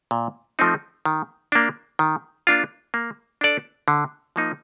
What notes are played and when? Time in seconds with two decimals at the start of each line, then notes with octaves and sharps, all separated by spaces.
0.11 A#2
0.59 F3 A3 C4 D#4
1.05 D#3
1.52 A#3 D4
1.99 D#3
2.47 A#3 D4 F4
2.94 A#3
3.41 D4 A4 D5
3.88 D3
4.36 F3 A#3 D#4